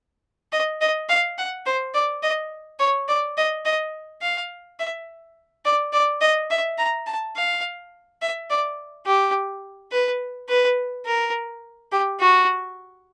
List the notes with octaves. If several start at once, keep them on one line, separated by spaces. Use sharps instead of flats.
D#5
D#5
F5
F#5
C5
D5
D#5
C#5
D5
D#5
D#5
F5
E5
D5
D5
D#5
E5
A#5
A5
F5
E5
D5
G4
B4
B4
A#4
G4
F#4